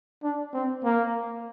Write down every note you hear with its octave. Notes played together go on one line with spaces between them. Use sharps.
D4
C4
A#3